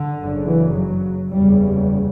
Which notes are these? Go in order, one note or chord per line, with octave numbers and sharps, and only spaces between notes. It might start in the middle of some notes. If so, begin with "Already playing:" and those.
Already playing: D3
F#1 F#2 C#3
E3
F#3
F#1 E2 C#3 G3